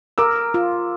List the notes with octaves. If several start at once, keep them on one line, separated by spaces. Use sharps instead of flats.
A#4 D6 E6
F4